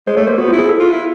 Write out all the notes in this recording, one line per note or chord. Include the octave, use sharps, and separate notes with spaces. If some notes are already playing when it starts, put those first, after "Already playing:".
G#3 C5
A3 C#5
A#3 C5
B3 F#4
E4 F4
G#4
A4
F4
E4